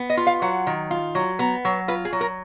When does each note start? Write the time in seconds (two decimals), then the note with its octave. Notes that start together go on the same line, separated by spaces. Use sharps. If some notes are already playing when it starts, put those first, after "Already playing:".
Already playing: B3
0.10 D#5
0.17 F4
0.27 F5
0.42 F#3 F#5
0.67 D#3
0.91 F4
1.15 F#3
1.39 B3 A#5
1.65 F#3
1.88 F4 B4
2.05 G#4
2.13 F#3
2.21 A#4